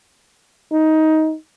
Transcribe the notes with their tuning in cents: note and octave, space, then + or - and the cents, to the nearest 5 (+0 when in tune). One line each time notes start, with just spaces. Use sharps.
D#4 +15